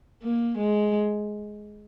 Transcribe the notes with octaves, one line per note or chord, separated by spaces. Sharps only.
A#3
G#3